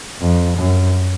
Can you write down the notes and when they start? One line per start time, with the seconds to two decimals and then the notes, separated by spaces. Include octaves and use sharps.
0.20 F2
0.58 F#2